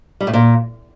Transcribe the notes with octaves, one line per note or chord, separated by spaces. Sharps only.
G3
A2
A#2